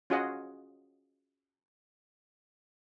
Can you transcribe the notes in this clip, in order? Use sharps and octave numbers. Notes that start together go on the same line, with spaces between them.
C#4 F4 F#4 G#4 D#5 F#5